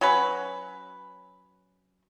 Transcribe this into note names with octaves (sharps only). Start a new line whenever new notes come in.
F#3 C#4 B4